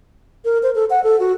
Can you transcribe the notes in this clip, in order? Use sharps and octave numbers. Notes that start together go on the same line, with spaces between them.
A#4
C5
A4
F#5
A4
F#4